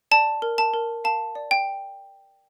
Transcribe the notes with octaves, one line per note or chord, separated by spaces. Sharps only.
D5 A5
A#4
A5
A#4
F5 A5
D5
G5